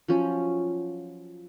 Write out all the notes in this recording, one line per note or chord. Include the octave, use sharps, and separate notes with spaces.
F3 F#3 C#4